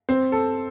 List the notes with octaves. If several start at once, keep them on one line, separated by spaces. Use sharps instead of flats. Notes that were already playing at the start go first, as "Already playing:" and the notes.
C4
A4